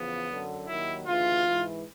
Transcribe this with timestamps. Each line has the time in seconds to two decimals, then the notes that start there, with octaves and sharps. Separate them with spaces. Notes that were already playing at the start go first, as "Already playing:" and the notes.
Already playing: E2 C#3 F3 B3
0.29 F#2 D3 F#3
0.68 D#2 D#3 F#3 E4
1.07 D2 C#3 E3 F4
1.45 G#2 E3